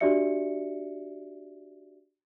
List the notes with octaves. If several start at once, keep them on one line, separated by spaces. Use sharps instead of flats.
D4 F#4 G4 D5 E5 C#7